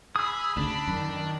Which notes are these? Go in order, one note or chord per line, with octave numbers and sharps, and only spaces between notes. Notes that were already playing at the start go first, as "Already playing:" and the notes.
G#4 B5 D#6 E6
D2 C#3 D4
F#2 D#3